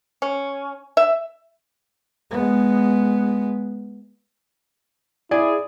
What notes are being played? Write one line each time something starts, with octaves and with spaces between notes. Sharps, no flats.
C#4
E5
G#3 B3
E4 G#4 D5